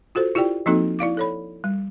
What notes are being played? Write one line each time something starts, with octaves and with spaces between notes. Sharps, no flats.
F4 F#4 A4 C5
E4 F4 G4 D5 G5
F3 A#3 C4 D#4 F#4 A4
E4 D5 F5 D6
A4 C#5 B5
G3